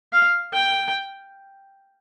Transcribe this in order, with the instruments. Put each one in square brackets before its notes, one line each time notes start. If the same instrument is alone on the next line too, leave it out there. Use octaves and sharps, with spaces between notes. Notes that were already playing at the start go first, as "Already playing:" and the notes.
[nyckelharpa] F5
G5